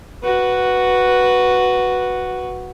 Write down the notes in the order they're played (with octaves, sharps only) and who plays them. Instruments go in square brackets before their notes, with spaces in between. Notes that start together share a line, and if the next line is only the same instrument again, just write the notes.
[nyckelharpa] F#4 B4